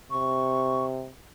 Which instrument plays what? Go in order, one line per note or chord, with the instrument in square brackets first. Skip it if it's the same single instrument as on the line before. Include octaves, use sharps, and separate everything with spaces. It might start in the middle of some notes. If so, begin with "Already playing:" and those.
[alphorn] C3 [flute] C#6